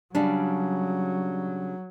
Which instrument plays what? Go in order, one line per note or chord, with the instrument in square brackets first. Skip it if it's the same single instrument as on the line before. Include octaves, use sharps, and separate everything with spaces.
[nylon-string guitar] C#3 G3 D4 [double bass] F#3